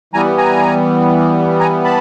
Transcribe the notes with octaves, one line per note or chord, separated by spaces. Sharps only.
E3 G3 B3 G#5 A#5
G#5 A#5
G#5 A#5
A5 B5